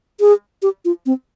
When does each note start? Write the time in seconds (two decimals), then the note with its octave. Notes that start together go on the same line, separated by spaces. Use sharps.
0.20 G#4
0.62 G4
0.85 F4
1.06 C4